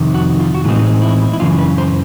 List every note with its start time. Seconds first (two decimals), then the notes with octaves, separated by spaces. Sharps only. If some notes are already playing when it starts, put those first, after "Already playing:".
Already playing: F2 C3 D#3
0.14 F#4
0.40 F4
0.55 F#4
0.64 A2 E3 G#3 C4 D#4 F4
1.02 E4
1.33 E4
1.40 F#2 C#3 E3 F4
1.58 B4
1.78 C5